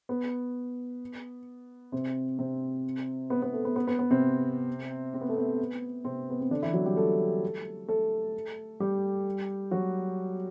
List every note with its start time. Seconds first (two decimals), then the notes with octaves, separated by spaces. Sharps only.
0.09 B3
1.92 C3 C4
2.39 C3 C4
3.30 B3
3.42 B3
3.53 A3
3.65 B3
3.76 B3
3.87 B3
3.99 B3
4.11 C3 C4
5.14 C4
5.21 B3
5.29 A3
5.37 B3
6.05 C3 C4
6.30 B3
6.41 C4
6.51 D3 D4
6.62 E3 E4
6.73 F#3 F#4
6.85 G3 G4
6.97 A3 A4
7.88 A3 A4
8.80 G3 G4
9.71 F#3 F#4